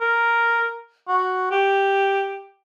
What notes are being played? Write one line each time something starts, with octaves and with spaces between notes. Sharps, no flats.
A#4
F#4
G4